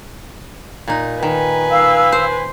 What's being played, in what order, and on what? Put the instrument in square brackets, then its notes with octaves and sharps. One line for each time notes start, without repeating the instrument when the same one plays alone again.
[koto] A#2 D#4
[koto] D#3 [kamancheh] B4 G#5
[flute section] F5 E6
[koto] C5